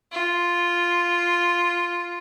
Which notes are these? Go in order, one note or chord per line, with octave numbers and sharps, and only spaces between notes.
F4